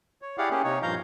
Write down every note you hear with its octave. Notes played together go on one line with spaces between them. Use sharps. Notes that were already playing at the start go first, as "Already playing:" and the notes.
C#5
E4 G4 G#4 D5 F5 F#5
A#3 C#4 G4 G#4
C3 D#4 C#5
G2 A#2 F3 F5 A#5 G6